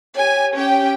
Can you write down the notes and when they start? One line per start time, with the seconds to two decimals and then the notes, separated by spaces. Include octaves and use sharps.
0.15 G4 C#5 G#5
0.53 C#4 G4 G5